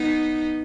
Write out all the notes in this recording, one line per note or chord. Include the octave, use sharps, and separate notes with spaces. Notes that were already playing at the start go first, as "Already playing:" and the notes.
Already playing: B3 D#4